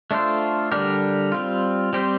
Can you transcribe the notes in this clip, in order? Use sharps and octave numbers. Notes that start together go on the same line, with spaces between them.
A3 D4 F4 A4 C5
D3 G3 D4 G4 A#4
G3 C4 F4
G3 C4 G4 C5